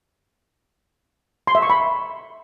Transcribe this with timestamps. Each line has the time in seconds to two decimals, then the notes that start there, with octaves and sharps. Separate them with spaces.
1.47 C6
1.55 E5
1.62 C#6
1.70 B5